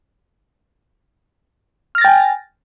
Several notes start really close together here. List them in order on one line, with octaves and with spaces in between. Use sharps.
F6 A#6 A6 G5 G#5